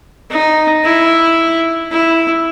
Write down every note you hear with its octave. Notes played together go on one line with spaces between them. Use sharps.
D#4
E4
E4